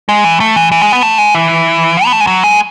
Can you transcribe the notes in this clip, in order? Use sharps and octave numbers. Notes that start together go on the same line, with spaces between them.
G#3
E3
A3
E3
E3
G#3
B3
A3
G#3
E3
B3
A3
G#3
F#3
G#3